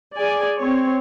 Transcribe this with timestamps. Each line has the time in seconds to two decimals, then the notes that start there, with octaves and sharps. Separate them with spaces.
0.17 G#4 D5 G#5
0.60 C4 C#5